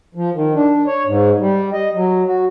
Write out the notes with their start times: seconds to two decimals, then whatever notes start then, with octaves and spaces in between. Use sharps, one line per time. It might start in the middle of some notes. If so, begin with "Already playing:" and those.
0.15 F3
0.34 D#3
0.54 D4
0.87 C#5
1.06 G#2
1.39 G3
1.73 D#5
1.94 F#3
2.27 F#4